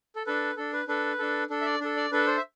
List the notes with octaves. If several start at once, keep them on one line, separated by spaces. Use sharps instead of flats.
A4
D4 A4 B4
D4 A4
B4
D4 A4 B4
D4 A4
D4 A4
E5
D5
D4 A4
D5
D4 A4 B4
C5
E5